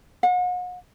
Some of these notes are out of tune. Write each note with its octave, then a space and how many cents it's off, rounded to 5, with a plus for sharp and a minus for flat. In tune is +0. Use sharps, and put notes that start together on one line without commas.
F#5 -40